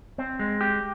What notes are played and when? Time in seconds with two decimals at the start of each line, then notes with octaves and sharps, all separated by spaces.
0.18 C4
0.39 G#3
0.61 G4